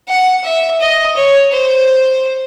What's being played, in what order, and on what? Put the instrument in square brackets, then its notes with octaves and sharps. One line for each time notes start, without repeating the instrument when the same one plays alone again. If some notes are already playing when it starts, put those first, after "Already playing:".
[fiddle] F#5
E5
D#5
C#5
C5